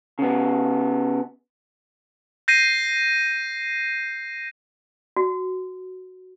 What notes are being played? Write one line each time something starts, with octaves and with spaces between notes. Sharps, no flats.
C#3 B3
G6 A#6 C7 D#7
F#4